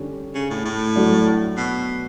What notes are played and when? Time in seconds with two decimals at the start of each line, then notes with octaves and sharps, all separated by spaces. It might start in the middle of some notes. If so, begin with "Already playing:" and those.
Already playing: D3 G3 C#4
0.35 C#3
0.50 A2
0.65 A2
0.96 F#3 A3 D4 F#4
1.57 B2